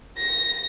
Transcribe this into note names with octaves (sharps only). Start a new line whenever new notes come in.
A#6